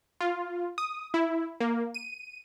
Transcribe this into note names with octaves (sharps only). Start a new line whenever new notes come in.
F4
D#6
E4
A#3
D#7